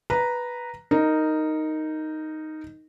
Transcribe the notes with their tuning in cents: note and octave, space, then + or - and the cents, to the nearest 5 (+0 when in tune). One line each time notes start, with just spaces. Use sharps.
B4 -5 A#5 +0
D#4 +0 A#4 -15